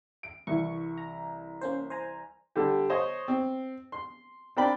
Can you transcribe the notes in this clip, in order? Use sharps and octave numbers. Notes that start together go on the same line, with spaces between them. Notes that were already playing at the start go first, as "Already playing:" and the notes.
D7
C2 E3 C#6
A#5
A#3 C#4 C5
C5 G#5 A#5
D3 G3 G4
C5 C#5 D#5
C4
C6
C4 D4 A#4 D5 G5 B5